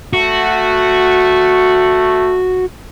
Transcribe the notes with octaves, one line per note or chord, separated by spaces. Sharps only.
A3 F#4